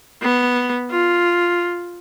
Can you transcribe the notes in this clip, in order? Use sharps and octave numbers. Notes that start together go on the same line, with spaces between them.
B3
F4